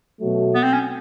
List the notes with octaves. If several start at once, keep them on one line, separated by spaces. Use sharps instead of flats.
B2 F#3 A3
B3
C4
C#4